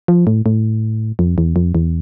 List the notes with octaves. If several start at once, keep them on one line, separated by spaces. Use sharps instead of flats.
F3
A2
A2
F2
E2
F2
E2